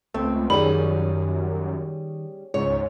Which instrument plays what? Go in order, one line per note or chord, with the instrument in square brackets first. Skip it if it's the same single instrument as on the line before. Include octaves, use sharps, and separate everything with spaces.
[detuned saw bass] C#2 [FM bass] A3 [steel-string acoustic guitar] C4
[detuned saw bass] F#2 [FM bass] D#3 [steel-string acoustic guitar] G3 C#4 G#4 [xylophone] B5
[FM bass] C#2 [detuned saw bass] G#2 [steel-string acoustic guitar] C#5